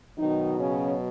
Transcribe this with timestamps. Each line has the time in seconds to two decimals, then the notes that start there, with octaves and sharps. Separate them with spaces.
0.18 B2 D#3 F#3 D#4
0.58 C#3 C#4